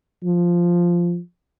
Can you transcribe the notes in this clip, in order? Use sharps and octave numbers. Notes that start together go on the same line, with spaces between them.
F3